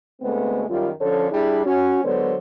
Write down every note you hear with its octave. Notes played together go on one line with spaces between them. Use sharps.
D2 G#3 A3 B3 C4
F#2 D#3 G3 F4
D3 F3 C#4 A4 C#5
G3 D4 E4 G#4
C#4 F#4
D3 F#3 G#3 B3 C5 C#5